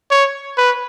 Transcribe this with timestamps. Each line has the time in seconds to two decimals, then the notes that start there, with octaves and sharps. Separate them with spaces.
0.11 C#5
0.57 B4